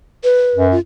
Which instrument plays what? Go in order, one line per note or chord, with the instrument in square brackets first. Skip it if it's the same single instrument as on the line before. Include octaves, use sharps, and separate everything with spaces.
[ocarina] B4
[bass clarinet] F#2
[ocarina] F4